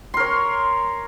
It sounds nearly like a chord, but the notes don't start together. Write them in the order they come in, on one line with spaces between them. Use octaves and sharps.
C6 A#4 C#5